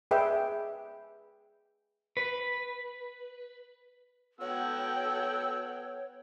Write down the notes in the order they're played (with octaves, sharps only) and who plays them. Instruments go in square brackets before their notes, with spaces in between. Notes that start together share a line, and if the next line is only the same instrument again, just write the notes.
[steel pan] G#4 B4 D5 E5 G5
[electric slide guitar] B4
[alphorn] B3 [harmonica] F#4 E6 [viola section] A4 G5 [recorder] C#5